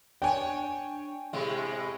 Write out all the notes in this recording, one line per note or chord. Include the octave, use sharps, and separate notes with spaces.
D4 C#5 G5 G#5
A2 C3 G#3